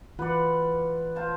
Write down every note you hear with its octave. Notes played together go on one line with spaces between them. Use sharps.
E3 F4 B4 D5 F#5
F4 C5 A5